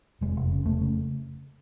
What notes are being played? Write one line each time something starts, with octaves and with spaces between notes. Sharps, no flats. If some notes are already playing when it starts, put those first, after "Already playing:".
F1 G#3
F1
C#3
F1 A3
C#3